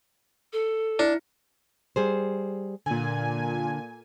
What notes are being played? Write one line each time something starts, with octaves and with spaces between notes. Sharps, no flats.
A4
D4 E4
G3 G#4 C5
A#2 D3 G#5